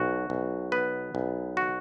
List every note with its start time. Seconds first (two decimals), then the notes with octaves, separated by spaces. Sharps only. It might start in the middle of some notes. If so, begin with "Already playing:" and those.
Already playing: B1 F#4
0.30 B1
0.72 B3 B4
1.15 B1
1.57 F#4